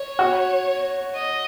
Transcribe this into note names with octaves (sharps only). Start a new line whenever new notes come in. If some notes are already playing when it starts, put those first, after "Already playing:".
Already playing: C#5
F#4
D#5